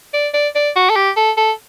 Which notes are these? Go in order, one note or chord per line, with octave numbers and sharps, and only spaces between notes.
D5
D5
D5
F#4
A4
G4
A4
A4